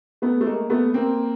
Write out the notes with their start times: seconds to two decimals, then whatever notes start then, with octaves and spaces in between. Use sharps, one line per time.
0.22 A3 B3
0.41 A3
0.46 G#3 A#3
0.70 A3 B3
0.94 A#3 C4